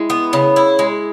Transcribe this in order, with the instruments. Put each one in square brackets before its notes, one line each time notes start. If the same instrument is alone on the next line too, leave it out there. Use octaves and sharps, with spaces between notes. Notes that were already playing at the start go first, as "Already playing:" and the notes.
Already playing: [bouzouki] G#3 [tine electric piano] E4
[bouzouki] B3
C#3
E4
G#3